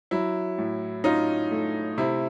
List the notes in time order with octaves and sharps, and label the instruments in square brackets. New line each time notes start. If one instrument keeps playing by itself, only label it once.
[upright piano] F#3 E4
A2
C#4 D#4 F4
A3
C3 E4